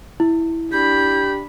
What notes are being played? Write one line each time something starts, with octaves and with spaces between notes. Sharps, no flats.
E4
D4 G4 B5 G6